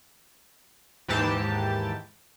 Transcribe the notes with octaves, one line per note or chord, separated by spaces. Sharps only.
D#2 G#2 E3 G4 A5